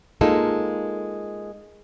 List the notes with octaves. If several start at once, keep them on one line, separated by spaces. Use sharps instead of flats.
G#3 A#3 D#4 F4 A4